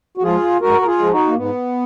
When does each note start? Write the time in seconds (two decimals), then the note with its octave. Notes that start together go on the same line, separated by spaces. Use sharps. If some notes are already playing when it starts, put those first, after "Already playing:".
0.17 F#4
0.23 F3 G#3 F4 G#4
0.60 G#2 F#4 A#4
0.81 A#4
0.86 F4 G#4
0.99 F3 G#3
1.12 D#4 F#4
1.27 A#3
1.36 G#2 B3